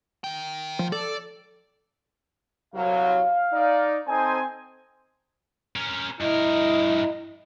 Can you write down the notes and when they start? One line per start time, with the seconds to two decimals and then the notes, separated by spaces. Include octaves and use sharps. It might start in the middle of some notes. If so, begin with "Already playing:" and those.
0.24 D#3 G5
0.79 F3
0.92 A4 D5
2.75 C2 F#3 F5
3.53 D#4 D5
4.08 C4 D#4 A4 C5 G#5
5.76 C#4 A#4
6.21 G2 E4 A#4 D#5